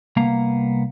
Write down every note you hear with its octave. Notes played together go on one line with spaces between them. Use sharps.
C2 A#3 B3 F5 A#5